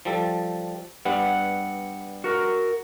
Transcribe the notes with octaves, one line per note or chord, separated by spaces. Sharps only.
F3 G3 A4
G2 G3 B3 F#5
F#4 A#4